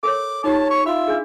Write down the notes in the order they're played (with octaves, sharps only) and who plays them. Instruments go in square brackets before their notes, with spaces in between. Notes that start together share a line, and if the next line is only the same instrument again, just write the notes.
[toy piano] A4 A#4 C#5 [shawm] D6
[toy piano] D#4 F4 G4 [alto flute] C#5 [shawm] A5
[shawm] C#6
[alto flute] F4 [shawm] E5 [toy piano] B5 C6
[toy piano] D4 G#4